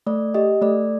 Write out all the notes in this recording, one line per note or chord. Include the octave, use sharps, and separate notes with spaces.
A3 D5
G4 D#5
A3 D5